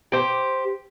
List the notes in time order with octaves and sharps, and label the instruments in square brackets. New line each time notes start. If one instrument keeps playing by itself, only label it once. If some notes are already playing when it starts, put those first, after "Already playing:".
[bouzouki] G4 C5